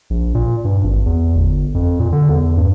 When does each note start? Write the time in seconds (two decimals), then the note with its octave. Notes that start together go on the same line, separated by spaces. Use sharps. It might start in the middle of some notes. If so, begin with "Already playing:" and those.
0.10 A#1
0.35 A#2
0.65 G2
0.84 G#1
1.06 E2
1.35 G1
1.75 F2
1.99 A#2
2.12 D3
2.29 E2
2.57 G2